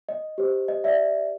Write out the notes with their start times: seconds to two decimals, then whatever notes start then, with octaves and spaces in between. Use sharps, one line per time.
0.09 D#5
0.38 G4 C5
0.68 D#5
0.84 D5 E5